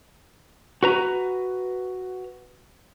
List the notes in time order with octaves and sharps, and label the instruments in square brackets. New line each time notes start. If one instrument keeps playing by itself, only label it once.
[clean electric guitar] F#4 B4 A#5